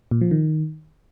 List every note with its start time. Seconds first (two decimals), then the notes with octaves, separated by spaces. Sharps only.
0.11 A#2
0.21 F3
0.31 D#3